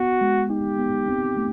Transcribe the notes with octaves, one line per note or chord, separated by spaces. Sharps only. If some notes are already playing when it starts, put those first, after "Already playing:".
Already playing: B3 F#4
G#3
D#4 G4
B3
C4
A3